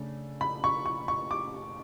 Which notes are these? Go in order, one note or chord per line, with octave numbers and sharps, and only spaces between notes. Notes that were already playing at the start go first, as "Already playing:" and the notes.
Already playing: C#3 A3 D4
B5
C#6
C#6
C#6
D6